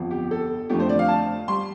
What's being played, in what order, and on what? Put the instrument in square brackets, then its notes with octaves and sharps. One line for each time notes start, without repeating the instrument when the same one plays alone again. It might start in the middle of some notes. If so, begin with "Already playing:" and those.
Already playing: [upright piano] G1 F2 F3
G4
A4
F2 D3 F3 A3 G4
C5
D5
F5
A5
G3 C6